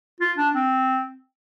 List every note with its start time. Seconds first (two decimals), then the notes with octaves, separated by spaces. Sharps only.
0.20 F4
0.38 D4
0.55 C4